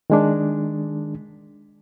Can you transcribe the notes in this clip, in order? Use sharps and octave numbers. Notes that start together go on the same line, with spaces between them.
D#3 G#3 D4